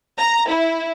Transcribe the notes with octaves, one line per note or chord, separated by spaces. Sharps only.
A#5
E4